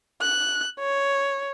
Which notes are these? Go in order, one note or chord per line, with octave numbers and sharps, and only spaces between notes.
F#6
C#5